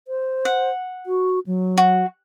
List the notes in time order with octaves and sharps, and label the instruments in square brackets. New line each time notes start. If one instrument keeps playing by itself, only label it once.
[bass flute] C5
[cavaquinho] F#5
[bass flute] F#4
F#3
[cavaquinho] F#4